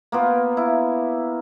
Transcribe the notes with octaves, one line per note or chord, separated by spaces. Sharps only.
A#3 B3 F4
E4